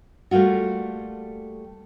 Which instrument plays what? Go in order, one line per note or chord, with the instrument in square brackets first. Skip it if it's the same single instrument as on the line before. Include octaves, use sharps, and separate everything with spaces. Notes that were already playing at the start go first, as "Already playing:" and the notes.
[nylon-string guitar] G3 A3 A#3 F4 F#4